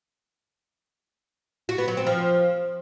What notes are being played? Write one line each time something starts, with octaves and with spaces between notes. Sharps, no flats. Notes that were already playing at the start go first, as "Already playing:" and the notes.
F#4
B3
F#3
C4
F3